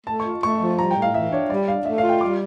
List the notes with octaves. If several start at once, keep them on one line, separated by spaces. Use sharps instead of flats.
A3 A5
C#6
F4
A3 C#6
F3
G3 A#5
G5
A2
F5
E3 E5
D4 C#5
G3 D5
D4 F5
A3 E5
F5
F4
G5
G3 D6